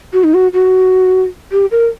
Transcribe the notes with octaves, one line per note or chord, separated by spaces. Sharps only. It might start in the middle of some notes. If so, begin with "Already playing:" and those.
F#4
D#4
F#4
F#4
G4
A#4